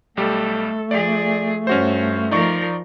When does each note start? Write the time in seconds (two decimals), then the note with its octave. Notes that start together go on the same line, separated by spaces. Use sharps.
0.17 B1 G3 A3 G4 A4
0.91 F3 G#4 D5
1.67 G2 C#4 F#4 C5
2.31 F3 D#4 A#4 D5 C#6